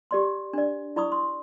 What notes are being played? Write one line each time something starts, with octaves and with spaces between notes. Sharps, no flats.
G4 D5 C6
D4 D5
E4 D5 B5 C#6 D#6
C6